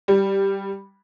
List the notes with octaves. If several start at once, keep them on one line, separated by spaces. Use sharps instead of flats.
G3